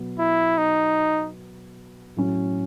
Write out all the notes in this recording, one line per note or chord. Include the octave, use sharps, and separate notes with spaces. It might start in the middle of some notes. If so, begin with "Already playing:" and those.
Already playing: B2 F#3 B3
E4
D#4
A2 F#3 C#4